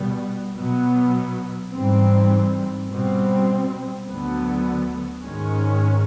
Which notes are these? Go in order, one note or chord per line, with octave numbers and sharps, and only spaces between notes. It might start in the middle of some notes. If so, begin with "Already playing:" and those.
Already playing: B2 G3 B3
B2 F#3 B3
G#2 E3 G3 C4
B2 G3 C4
D2 D3 F#3 B3
G#2 D#3 G#3 C#4